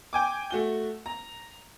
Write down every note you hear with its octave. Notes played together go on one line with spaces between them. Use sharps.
G5 G#5 D6
A3 F#4 G7
A#5